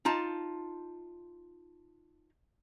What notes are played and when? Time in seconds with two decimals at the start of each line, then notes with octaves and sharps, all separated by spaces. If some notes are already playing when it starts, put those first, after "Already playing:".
0.05 D#4 F4 A5